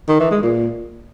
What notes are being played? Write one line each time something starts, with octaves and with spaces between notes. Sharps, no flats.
D#3
E3
G#3
A#2